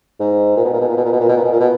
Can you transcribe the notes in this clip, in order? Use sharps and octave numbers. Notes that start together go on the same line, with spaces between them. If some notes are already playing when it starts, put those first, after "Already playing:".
G#2
A#2
B2
A#2
B2
A#2
B2
A#2
B2
A#2
B2
A#2
B2
A#2
B2